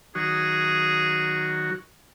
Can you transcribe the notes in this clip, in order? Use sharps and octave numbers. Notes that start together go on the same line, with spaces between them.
D#3 F#3 F#4 G#4